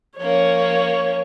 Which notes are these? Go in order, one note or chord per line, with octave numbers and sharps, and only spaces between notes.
F3 A#3 C#4 C#5